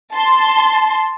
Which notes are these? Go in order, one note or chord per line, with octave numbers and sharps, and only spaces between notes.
A5 C6